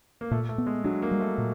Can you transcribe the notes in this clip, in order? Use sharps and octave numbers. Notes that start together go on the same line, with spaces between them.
A#3
A#2 A3
A3
B3
G#3
F#3 D4
A#3
G3
A3
A#2